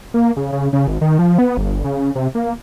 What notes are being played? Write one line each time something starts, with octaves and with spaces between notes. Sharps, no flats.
A#3
C#3
C#3
C#3
G#1
D#3
F3
B3
G1
C#3
C3
A#3